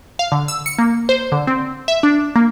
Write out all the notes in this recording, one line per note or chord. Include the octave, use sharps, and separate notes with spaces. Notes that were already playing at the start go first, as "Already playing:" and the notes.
F5
D3
E6
C#7
A#3
C5
D3
C4
E5
D4
A#3